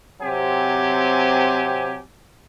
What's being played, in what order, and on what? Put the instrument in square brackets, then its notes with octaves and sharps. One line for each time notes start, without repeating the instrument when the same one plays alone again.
[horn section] C3 F#3 C4 G4 G#5